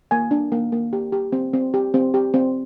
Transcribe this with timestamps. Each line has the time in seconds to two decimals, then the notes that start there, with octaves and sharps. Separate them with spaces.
0.11 A#3 G#5
0.31 D4
0.52 A#3
0.72 A#3
0.93 G4
1.12 G4
1.32 C4
1.53 C4
1.74 G4
1.94 C4
2.14 G4
2.34 C4